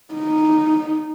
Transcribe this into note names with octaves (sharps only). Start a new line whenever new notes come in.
D#4